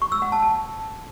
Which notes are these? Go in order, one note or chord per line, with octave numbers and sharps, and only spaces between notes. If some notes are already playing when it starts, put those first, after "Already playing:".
C#6
E6
F#5
A5
A5